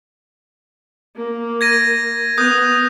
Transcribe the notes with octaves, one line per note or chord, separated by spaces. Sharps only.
A#3
G#6 A#6 D#7
B3 D#6 F#6 G6